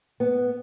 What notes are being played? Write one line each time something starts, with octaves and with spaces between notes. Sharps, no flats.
B3